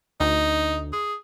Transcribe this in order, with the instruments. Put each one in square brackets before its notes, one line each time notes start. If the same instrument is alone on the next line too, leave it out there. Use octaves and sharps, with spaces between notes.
[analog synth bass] D2 [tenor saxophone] D#4
[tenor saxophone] G#4